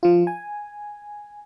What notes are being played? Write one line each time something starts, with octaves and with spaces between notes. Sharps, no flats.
F3 F4
G#5